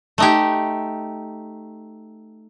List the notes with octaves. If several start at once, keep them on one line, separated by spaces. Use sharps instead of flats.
A3 D#4 G4